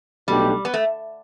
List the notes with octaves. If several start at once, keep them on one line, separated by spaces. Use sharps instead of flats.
B1 B2 G3 A3 D4 G4
B3
A3